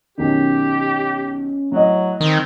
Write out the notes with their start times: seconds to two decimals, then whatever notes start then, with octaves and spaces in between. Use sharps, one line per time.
0.18 B1 D#3 C#4 G4
1.72 A2 F#3 D#5
2.20 D#3 C4